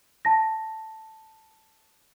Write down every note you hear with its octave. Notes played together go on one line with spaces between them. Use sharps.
A5 A#6